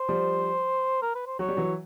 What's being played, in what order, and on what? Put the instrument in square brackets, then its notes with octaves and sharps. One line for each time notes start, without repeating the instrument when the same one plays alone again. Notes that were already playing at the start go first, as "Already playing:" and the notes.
Already playing: [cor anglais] C5
[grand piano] F3 G3
[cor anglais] A#4
B4
C5
[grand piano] F#3 [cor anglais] C#5
[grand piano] G3
E3 F#3